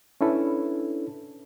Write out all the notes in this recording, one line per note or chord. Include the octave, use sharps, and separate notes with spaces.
C#4 D4 E4 A4 B4